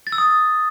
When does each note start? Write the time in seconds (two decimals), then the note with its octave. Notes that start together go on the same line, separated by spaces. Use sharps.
0.07 A6
0.12 E6
0.18 D#6